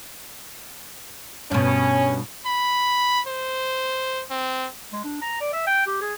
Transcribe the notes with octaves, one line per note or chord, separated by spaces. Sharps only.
G2 B2 C#4
B5
C5
C4
G#3
D4
A#5
D5
E5
G5
G4
G#4